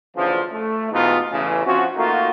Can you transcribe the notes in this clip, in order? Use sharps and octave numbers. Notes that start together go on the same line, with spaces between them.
D2 C#3 E3 F3
A3
G#2 B2 E3 B3 D#4 F4
A1 C#3 E3
F3 C4 C#4 F#4
A3 A#3 D#4 F4 F#4